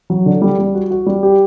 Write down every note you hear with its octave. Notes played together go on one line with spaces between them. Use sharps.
F#3
D3
G3
G3
F#4
F#4
G3
G4